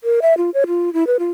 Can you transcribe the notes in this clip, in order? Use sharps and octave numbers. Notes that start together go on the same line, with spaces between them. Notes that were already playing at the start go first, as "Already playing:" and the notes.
A#4
E5
F4
C#5
F4
E4
B4
F4